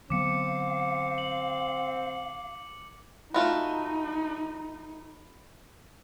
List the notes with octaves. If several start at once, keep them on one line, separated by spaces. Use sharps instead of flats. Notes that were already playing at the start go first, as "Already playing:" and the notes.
D3 F#3 B3 C4 F5 D6 C#7
F#7
A3 D#4 F4 F#4 B5